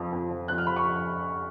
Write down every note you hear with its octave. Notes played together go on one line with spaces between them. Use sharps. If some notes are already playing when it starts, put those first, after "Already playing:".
Already playing: F2 F3
F2
F3
F2 F#6
F6
F3 B5
C#6